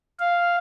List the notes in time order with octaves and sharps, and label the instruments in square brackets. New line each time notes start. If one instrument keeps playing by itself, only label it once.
[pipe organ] F5